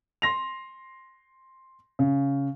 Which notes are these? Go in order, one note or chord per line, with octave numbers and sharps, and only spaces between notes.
C6 A#6 F7
C#3